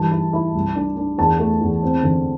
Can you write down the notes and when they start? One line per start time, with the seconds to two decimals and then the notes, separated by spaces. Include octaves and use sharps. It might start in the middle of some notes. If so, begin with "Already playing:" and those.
Already playing: G2 E3 A5
0.11 E4
0.33 E4
0.54 C2
0.75 D4
0.97 D4
1.18 E2 A5
1.39 A3
1.61 E2
1.82 C4
2.03 D3